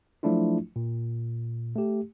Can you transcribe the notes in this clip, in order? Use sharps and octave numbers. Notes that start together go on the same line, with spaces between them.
F3 F#3 A3 D4 E4 F4
A#2
A3 G4